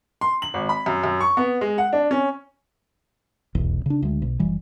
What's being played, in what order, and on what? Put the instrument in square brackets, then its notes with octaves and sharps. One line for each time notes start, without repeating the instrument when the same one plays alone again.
[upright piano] C6
F#7
G#1
B5
F#2
F#2
C#6
B3
G#3
F#5
D4
C#4
[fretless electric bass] F1 B1 E2
C#3 D4
D2 G#3
B1
F#1 E3 G3